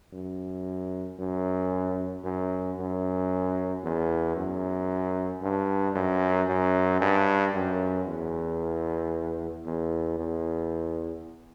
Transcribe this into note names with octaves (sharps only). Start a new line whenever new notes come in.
F#2
F#2
F#2
F#2
E2
F#2
G2
F#2
F#2
G2
F#2
E2
E2
E2